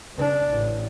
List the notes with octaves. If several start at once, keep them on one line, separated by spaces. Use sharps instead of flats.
C#3 D4
A1